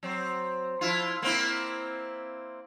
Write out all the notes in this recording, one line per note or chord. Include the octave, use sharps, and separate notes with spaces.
F#3 C4
F3 E4 F4
A#3 C4 E4